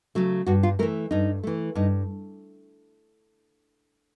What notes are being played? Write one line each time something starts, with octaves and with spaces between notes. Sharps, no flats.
C#3 F#3 A3
G2 F#4
F4
E3 A3 A#4
G2 D#4
E3 A3
G2 D#4